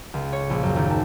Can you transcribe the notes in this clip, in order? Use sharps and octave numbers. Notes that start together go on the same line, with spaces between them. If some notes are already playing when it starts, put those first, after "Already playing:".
C#2
C#5
A#1
F#2
D#2
A5